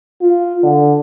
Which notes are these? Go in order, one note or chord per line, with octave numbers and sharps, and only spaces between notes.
F4
D3